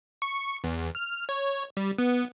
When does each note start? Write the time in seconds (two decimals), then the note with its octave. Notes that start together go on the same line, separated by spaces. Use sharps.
0.22 C#6
0.64 E2
0.95 F6
1.29 C#5
1.77 G3
1.98 B3